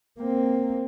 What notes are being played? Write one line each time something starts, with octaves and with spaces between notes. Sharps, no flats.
A#3 C4